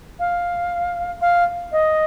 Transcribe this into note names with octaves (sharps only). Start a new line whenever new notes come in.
F5
F5
D#5